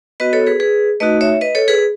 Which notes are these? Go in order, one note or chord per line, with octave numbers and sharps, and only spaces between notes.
B3 F#4 B4 D#5
A4 C#5
G#4 B4
G#4 B4
A3 D#4 F#4 B4 D#5
C#5 E5
B4 D#5
A4 C#5
G#4 B4